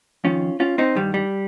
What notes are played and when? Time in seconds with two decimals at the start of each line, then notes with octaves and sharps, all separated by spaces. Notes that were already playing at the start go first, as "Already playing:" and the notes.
0.24 F2 D#3 C#4 F4
0.60 C#4 F4
0.78 C4 D#4
0.95 G2 D#3 G3
1.14 G3